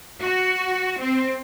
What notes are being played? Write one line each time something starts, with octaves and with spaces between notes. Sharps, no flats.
F#4
C4